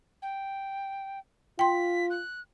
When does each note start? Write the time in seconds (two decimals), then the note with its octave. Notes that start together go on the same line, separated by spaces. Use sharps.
0.22 G5
1.59 F4 G5 C6 B6
2.10 F#6